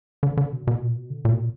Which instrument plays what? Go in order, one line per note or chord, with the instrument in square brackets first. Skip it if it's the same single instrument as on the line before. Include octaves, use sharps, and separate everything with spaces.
[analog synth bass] D3
D3
B2
B2
A#2
B2
D3
A#2
B2
A#2